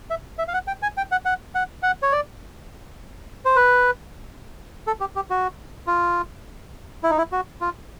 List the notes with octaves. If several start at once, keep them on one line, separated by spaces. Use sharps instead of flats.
E5
E5
F5
F#5
G5
G#5
G5
F#5
F#5
F#5
F#5
C#5
D5
C5
B4
A4
G4
G4
F#4
F4
E4
D#4
E4
F#4
F4